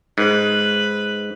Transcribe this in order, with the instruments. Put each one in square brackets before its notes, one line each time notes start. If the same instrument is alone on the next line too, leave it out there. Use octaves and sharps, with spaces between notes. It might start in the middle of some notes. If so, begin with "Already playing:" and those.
[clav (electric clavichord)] G#2 [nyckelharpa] B4